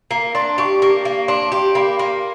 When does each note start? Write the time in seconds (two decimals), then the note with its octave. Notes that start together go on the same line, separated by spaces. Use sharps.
0.11 A#3 A#5
0.35 D4 C6
0.58 G4 C#6
0.82 A#3 C#6
1.05 A#3
1.28 D4 C6
1.52 G4 C6
1.75 A#3 B5
1.98 A#3 C6